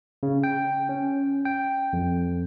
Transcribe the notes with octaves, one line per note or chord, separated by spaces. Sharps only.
C#3
G5
C#4
G5
F2